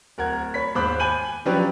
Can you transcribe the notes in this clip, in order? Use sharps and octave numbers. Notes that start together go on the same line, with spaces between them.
D1 A#4 F#5 G#6
C#5 B5 B6
D#2 G#2 C5 B5 D6 F#6
G#5 B5 G6 D#7 F#7
F3 F#3 C#4 D4 G4 B4